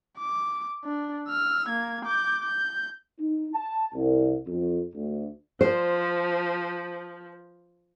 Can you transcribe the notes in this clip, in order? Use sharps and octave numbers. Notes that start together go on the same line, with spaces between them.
D6
D4
E6 F6
A#3 G#6
D6 G6
G6
D#4
A5
C2
F2
D2
F3 C5